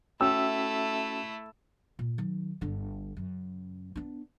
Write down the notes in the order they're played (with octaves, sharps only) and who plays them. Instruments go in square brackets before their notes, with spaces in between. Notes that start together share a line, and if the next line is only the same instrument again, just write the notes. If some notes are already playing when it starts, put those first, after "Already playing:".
[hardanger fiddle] A3 E4 [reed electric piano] C#4 F#4 G5 [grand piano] E6
[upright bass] A#2
D#3 F#3
G1 D3
F#2 C#3
B3 D4